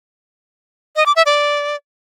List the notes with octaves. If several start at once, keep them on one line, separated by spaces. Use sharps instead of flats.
D#5
D6
E5
D5